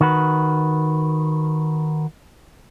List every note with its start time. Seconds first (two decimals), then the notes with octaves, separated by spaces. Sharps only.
0.01 D#3 F#4 B4